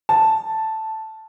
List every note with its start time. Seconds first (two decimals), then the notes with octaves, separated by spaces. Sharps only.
0.09 A5